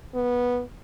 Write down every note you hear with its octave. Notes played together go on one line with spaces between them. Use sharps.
B3